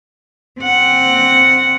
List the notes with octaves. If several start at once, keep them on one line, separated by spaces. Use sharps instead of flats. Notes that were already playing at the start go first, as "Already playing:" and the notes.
C4 F#5